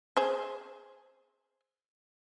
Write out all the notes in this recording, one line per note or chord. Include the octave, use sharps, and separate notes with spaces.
G#4 C5